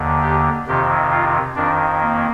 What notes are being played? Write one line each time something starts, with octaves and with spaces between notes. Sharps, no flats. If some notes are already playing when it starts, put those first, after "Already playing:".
Already playing: D#2 D3
G4
F2 C3 D#3 G4
F4
F2 D#3 D4
A#3